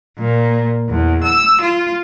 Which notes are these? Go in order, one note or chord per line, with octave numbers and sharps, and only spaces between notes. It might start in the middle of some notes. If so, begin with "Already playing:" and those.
A#2
E2
E6
F4